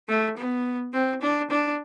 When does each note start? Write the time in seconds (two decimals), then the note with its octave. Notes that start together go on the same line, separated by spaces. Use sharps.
0.09 A3
0.37 B3
0.94 C4
1.22 D4
1.51 D4